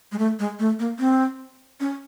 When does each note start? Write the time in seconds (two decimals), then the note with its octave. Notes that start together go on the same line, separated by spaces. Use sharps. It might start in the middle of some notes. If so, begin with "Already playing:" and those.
0.12 G#3
0.19 A3
0.39 G#3
0.59 A3
0.80 A#3
0.99 C4
1.80 C#4